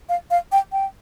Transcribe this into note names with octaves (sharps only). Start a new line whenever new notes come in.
F5
F5
G5
G5